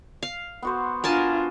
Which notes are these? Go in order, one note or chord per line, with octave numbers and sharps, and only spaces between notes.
F5
B3 F#4 C5
D4 F4 A#4 G#5 A5